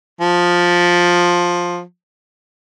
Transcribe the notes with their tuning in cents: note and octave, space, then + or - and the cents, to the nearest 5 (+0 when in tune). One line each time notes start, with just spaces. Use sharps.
F3 +10